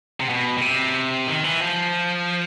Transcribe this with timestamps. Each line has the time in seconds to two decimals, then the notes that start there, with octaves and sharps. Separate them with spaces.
0.20 C3
0.29 B2
0.58 B2
0.61 C3
1.27 D#3
1.44 E3
1.60 F3